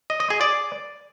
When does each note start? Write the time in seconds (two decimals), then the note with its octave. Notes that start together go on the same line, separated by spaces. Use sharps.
0.10 D#5
0.20 D#5
0.30 G#4
0.41 D5